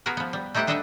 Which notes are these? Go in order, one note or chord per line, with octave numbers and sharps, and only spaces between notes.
B3 F#4 G#4 A#4 B4
F3 B3
G3
A3 D#4 E4 G4 C5 F#5
G3 D4 A4 D#5 E5 F#5